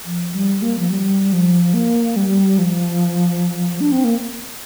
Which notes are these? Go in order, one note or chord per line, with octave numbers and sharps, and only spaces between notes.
F3
G3
A#3
F3
G3
F3
A#3
G3
F3
D4
C4
A#3